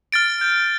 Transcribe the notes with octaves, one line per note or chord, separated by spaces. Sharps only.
F6 A6 D7
G6